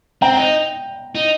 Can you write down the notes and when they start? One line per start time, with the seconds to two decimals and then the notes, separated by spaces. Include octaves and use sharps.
0.22 C4 G5 A#5
0.37 D#4
1.15 D#4